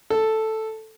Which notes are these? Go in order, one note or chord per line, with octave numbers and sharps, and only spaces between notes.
A4